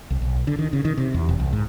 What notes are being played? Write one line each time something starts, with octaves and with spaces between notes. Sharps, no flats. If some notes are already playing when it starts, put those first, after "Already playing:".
C2
B1
D3
D#3
C#3
D#3
C3
E2
E1
C2
G#2